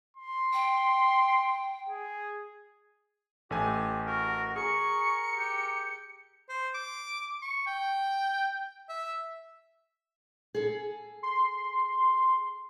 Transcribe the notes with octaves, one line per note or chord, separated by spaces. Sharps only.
C6
G5
G#4
A1 A3 G4 G#5
F#4 A#4
G#4 A#4 C#6 C#7
G4
C5
D6
C#6
G5
E5
G#4 A4
C6